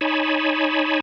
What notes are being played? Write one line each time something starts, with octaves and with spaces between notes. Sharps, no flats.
D#4 C#5 G#5 A5 B5